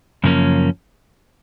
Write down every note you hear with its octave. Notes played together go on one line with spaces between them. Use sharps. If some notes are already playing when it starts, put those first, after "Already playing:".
F#2 C#3 F3 A#3 C#4